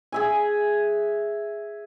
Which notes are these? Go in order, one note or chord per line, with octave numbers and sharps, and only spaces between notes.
G#4 E5 G#5